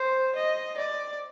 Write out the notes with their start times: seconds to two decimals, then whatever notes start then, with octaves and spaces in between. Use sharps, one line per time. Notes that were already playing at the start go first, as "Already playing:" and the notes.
Already playing: C5
0.36 D#5
0.78 D5